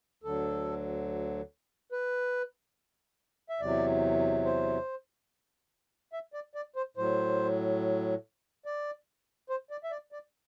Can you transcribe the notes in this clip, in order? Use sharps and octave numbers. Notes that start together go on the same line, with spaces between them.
D2 D3 F#3 A4
B4
E5
E2 C3 F#3 D5
C5
E5
D5
D5
C5
A2 F#3 C5
D5
C5
D5
E5
D5
D5